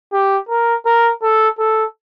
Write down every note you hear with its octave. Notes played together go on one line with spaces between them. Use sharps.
G4
A#4
A#4
A4
A4